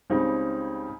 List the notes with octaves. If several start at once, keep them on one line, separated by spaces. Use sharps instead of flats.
C#2 C#3 G3 C4 D#4